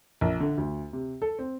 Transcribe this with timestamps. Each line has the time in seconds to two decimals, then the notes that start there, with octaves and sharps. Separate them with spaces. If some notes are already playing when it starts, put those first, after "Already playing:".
0.21 A#1
0.40 D3
0.58 D2
0.93 C3
1.22 A4
1.39 C4